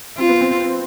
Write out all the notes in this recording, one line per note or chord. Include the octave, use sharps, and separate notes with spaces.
C4 F4
B3
C4